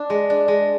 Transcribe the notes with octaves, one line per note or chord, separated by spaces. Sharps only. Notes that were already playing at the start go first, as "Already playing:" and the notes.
Already playing: D4
G#3
D4
G#3